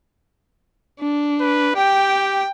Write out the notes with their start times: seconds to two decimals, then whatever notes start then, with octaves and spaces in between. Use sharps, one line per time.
0.99 D4
1.40 B4
1.75 G4 G5